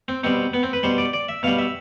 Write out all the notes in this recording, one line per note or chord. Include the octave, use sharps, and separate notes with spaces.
C4
B2 G3 C4
B3
C4
B4
B2 G3 C5
D5
D5
E5
B2 G3 F5
E5